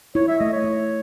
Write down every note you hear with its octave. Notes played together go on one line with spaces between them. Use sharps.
E4 C#5
E5
A3 D#5
C#5
E4